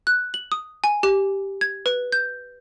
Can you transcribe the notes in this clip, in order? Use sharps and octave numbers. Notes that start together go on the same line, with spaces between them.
F#6
F#7
D#6
G#5
G4
G#6
B4
G6